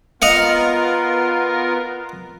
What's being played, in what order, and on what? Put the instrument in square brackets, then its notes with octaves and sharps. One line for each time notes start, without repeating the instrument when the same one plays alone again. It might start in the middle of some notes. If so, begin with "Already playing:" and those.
[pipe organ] B3 F4 A#4 [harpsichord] D#5 F5 F#5